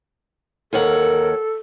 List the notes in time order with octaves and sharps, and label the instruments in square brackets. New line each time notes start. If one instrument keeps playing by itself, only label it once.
[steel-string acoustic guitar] D#2 C#5 F#5 [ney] A4 [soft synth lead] A#4